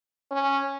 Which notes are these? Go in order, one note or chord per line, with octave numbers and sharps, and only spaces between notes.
C#4